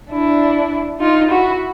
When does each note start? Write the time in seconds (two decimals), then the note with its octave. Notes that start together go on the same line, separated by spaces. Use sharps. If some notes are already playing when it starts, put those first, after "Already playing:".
0.11 D4 E4
1.01 D#4 F4
1.31 E4 F#4